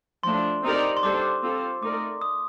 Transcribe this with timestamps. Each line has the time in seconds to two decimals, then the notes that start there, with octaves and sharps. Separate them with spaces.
0.23 F3 A3 D4 C6
0.63 C4 D#4 G4 A#4 D5
0.97 C6
1.03 G3 D4 A4 C5 D6
1.43 C4 F4 A4 C5
1.82 A3 D#4 A#4 D5 D6
2.22 D#6